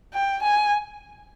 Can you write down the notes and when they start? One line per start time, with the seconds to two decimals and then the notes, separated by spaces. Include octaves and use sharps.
0.13 G5
0.43 G#5